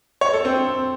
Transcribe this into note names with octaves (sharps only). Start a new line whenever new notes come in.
C#5
A4
C4